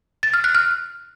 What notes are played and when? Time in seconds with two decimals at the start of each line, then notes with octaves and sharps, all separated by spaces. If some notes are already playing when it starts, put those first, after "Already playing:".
0.23 A6
0.34 F6
0.44 F#6
0.55 F6